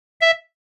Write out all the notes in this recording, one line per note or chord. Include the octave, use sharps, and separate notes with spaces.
E5